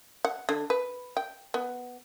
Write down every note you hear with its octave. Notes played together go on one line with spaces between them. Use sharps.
F#5
D3
B4
G5
B3